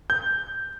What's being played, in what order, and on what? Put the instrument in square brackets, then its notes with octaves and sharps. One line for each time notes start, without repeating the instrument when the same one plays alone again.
[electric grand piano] G6